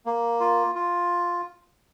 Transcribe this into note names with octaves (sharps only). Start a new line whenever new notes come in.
A#3
F4
F4